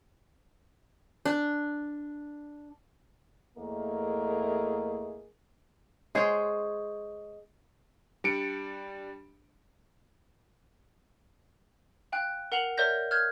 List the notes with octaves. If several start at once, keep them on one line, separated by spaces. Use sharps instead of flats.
D4
E2 A3 A#3 G#4 A#4 D#5
G#3 G#4 C5 C#5
G3 D4 C#7 D7
F5 G5 F#6
A#4 F#5 C7 F7 F#7
A#4 C#5 D5 E5 G6 A#6
F6 G6 G#6